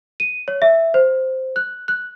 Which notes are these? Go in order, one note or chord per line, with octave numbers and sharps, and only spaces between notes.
D#7
C#5
E5
C5
F#6
F#6